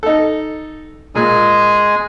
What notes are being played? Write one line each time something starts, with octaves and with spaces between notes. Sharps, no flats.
D#4 A4
A#2 G#3 G#4 G#5